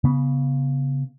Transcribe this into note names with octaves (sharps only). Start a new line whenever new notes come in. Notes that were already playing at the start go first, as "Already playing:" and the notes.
C#3 B3